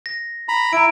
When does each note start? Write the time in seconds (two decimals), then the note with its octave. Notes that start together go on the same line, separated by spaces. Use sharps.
0.06 A#6
0.48 A#5 B5
0.73 E4 A#5 D7